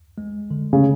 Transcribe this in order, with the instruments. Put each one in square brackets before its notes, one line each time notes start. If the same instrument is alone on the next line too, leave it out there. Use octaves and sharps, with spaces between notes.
[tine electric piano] G#3
D3
[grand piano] C#3